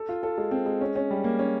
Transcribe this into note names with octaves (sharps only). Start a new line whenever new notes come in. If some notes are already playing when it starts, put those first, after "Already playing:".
Already playing: A4
F4
A4
G#3
C4
G#3
C#4
C#4
G3
A#3
C#4